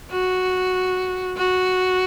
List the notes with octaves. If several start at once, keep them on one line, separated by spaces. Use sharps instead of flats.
F#4
F#4